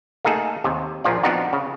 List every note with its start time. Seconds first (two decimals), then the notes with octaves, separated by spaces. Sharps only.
0.25 A3 A#3 D#4 G#4 A4
0.64 D#2 C3
1.04 A#1 A#2 F3 F4 D5
1.23 F3 B3 C4 D4 D#4 F#4
1.53 C#3